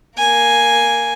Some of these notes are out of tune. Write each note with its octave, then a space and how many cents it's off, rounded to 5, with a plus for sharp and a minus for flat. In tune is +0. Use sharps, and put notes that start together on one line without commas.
A#3 +0 G#5 +0